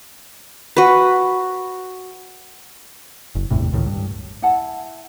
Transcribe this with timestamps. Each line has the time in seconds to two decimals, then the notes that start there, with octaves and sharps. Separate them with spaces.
0.77 F#4 B4
3.35 F#1
3.51 G1 E2 A2 C3
3.73 C#2 A2 D#3
3.86 G2
4.42 E4 F#5 A5